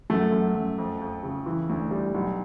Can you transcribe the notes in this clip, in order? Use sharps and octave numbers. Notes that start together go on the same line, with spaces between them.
F#2 A3
F#2
F#2
F2
F2
C#3
E3
D2
G3
B1